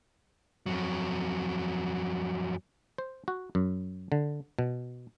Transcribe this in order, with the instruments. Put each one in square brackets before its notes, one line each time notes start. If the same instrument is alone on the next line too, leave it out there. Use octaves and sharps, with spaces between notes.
[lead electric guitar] F2 F#3
[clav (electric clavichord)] C5
F#4
F#2
D3
B2